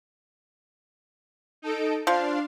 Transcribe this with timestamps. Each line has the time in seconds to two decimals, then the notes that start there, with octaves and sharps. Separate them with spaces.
1.62 D#4 A4 D7
2.07 F3 D4 F5 C6